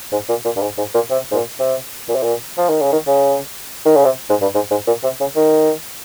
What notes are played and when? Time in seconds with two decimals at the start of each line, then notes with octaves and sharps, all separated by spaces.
0.12 G#2
0.29 A#2
0.45 A#2
0.56 G2
0.62 G#2
0.78 G#2
0.94 A#2
1.10 C3
1.31 G#2
1.34 A#2
1.60 C3
2.09 A#2
2.15 C3
2.23 A#2
2.57 F3
2.69 D#3
2.81 C#3
2.92 D#3
3.07 C#3
3.85 D#3
3.96 C#3
4.05 C3
4.30 G#2
4.41 G2
4.55 G#2
4.71 G#2
4.87 A#2
5.03 C3
5.20 C#3
5.36 D#3